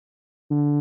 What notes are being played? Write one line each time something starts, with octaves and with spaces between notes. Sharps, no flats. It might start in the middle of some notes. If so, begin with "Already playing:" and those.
D3